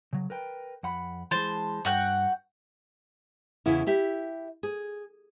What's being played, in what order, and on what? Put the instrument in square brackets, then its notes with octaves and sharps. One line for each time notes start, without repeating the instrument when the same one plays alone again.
[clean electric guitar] C#3 F#3
A#4 B4 G5
F2 F#5 B5
[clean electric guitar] E3 G#3 [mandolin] C5 A5
[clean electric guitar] G2 [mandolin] F#4 F#5 G5
[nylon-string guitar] E2 C#3 E4
E4 G4 E5
G#4